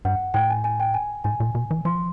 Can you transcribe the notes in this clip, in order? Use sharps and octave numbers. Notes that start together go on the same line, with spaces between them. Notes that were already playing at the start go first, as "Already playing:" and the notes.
G2 F#5
A2 G5
G#5
G#5
G5
G#5
A2 G#5
A#2
B2
E3
F3 C6